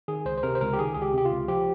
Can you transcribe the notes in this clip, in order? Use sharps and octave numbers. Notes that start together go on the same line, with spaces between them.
D#3 G#4
C#2 C5
C5
C3 A#4
C5
C#2 A#4
G4
D#3 G#4
C#2 G#4
G4
C3 G4
F4
C#2
F3 G4